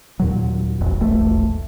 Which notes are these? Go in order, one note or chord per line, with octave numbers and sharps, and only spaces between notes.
D#2 A#2 F#3
E1 A#1 F2
E1 A#1 A3